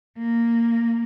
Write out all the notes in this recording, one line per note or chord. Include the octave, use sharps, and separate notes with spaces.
A#3